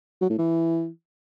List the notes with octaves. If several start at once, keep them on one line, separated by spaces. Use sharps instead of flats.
F#3
A2
E3